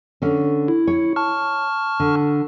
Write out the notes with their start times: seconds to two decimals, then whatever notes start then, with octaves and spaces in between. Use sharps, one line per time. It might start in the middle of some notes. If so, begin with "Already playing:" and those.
0.22 D3 C#4
0.68 E4
0.87 C#5
1.16 A5 C#6 F6
2.00 D3